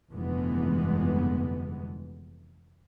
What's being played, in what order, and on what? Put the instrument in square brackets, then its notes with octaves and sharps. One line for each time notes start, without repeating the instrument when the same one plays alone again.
[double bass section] F1 G2 D3 E3 G#3 B3